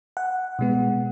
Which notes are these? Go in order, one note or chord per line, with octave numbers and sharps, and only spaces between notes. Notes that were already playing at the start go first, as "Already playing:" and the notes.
F#5
B2 G#3 B3